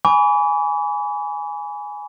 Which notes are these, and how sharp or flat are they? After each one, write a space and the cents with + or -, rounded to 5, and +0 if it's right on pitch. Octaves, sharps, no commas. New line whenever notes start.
G#5 +0 B5 +0 D6 -45